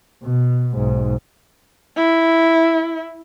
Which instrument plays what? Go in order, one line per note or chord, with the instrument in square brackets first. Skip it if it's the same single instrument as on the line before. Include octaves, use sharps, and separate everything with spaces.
[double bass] B2
B1 G#2
[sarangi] E4